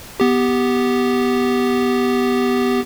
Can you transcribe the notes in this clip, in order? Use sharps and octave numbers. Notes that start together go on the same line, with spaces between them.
B3 G4